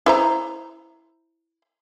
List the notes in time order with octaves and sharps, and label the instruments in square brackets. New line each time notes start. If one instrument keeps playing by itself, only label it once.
[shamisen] E4 C5 A#5